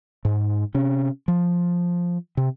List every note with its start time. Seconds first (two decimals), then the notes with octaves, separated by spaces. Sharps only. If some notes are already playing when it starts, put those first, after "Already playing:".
0.25 G#2
0.74 C3 C#4
1.28 F3
2.37 C3